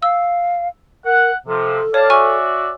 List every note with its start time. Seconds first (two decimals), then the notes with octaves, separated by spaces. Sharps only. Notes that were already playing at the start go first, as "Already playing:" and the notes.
0.02 F5 E6
1.05 A#4 F#5
1.47 C3 F3 A4
1.94 C#5 D5 F5 A5
2.10 F#4 D5 E5 G#5 C#6 F6